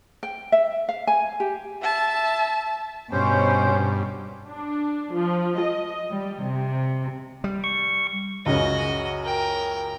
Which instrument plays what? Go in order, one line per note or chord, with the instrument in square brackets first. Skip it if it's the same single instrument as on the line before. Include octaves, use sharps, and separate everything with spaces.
[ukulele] G5
E5
F5
G#5
G4
[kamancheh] E5 A5
[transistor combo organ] G2 [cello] B2 [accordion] C#4 C5
[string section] D4
F3
D#5
G3
C3
[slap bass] G3
[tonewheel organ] C#6
[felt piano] C#2 F#2 C#3 [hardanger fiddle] F#4 D#5
[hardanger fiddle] A#4 G5